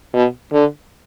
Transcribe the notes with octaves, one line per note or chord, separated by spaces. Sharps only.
B2
D3